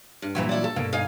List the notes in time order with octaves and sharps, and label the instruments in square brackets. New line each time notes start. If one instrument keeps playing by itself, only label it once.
[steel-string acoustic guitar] G2
[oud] A#2 E3 F#3
[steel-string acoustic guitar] E4 D5
A4
[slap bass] G2 B2 [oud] A#3
[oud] D#4 [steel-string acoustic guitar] F5 G#5